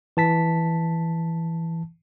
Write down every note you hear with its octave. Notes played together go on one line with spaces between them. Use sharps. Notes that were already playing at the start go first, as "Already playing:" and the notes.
E3 A5 B6